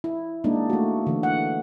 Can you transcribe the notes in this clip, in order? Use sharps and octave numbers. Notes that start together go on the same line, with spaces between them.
E4
G#3 A#3 D4 D#4
A3 F#4
D3 E3
F#5